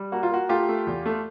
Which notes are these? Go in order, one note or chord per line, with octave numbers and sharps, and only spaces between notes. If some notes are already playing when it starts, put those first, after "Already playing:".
Already playing: G3
A#3 F#4
F4
A#3 F#4
A3 F4 G4
A3
E2
A3